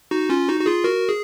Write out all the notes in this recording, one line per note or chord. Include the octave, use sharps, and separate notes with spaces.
D#4 F#4
C#4 F4
D#4 F#4
F#4
F4 G#4
F#4 A#4
G#4